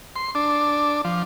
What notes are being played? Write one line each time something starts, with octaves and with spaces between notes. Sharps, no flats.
C6
D4
F3